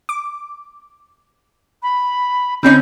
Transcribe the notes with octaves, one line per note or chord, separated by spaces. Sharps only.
D6
B5
D3 C4 C#4 D#4 B5 G6